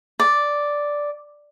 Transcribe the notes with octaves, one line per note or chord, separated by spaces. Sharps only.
D5